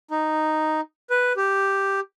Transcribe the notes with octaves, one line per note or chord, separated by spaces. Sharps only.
D#4
B4
G4